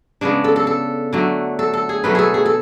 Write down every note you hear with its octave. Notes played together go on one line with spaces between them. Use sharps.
C#3 G#3 B3 D4
A4
A4
A4
D3 F#3 A3
A4
A4
G#4
B2 F#3 A3 B4
G#4 A4
G#4
A4